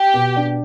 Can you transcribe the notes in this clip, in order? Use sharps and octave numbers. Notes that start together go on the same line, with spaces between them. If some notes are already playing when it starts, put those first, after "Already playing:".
Already playing: G4
B2
D4